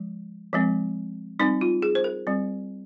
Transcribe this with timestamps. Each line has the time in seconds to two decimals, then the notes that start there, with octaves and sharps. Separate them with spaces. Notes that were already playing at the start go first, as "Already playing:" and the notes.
Already playing: F3 G#3
0.53 F3 G#3 C4
1.39 G3 C4 D#4
1.61 F4
1.82 G#4
1.95 C5
2.04 A#4
2.27 G3 C4